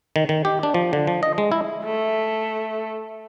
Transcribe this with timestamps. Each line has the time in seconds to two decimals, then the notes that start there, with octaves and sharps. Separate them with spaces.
0.16 D#3
0.29 D#3
0.45 G4
0.63 D4
0.74 F3
0.93 D3
1.07 F3
1.23 D#5
1.38 G#3
1.52 E4
1.84 A3